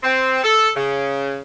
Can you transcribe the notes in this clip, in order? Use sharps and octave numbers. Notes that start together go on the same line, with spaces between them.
C4
A4
C#3